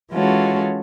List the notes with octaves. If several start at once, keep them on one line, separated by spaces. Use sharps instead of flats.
E3 G#3 C#4 F4 F#4 A4